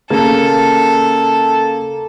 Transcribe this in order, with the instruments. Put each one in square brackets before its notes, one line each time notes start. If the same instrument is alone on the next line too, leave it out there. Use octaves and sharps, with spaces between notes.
[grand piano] C#3 A#3 [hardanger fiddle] A4